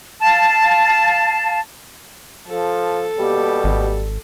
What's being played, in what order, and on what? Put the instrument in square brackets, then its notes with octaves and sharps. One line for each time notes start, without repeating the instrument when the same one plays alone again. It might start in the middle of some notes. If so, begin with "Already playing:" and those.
[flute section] F5 A5
[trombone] F3 [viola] A4
[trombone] B2 [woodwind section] G3 A#3 G4
[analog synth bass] G#1